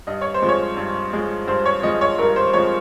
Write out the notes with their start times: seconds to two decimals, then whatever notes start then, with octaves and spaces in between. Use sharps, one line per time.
0.07 G2 D#5
0.21 C#5
0.34 C5
0.42 F3 G#3
0.49 C#5
0.77 G2
1.13 F3 G#3
1.48 G2 C5
1.66 C#5
1.83 F3 G#3 D#5
2.01 C#5
2.19 G2 A#4
2.36 C5
2.53 F3 G#3 C#5